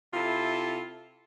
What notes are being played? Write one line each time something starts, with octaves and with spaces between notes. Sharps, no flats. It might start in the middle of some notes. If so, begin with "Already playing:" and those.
C3 E4 F4 A4